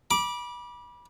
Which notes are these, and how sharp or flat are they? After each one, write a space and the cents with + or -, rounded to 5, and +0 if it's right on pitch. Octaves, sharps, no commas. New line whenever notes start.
B5 -30 D6 +0